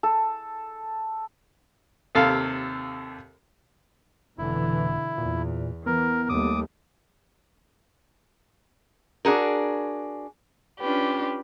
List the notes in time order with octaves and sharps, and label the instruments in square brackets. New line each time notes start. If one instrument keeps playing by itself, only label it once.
[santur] A4
[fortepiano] D#2 C3 A4 F5
[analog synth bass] F1 [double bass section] B2 D3 E3 [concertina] E4
[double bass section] E2 [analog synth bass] A#2
[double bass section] E3 [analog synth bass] B3 [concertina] A#4
[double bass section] D#2 G3 A3 [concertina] D6 D#6
[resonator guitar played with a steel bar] D4 F#4 G#4 A#4
[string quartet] C#4 D4 F4 G4 B4